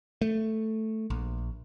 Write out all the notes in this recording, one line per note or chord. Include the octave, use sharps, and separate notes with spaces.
A3
A#1